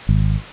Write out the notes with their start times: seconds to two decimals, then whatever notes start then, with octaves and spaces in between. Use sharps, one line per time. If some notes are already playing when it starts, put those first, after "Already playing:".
0.09 G#1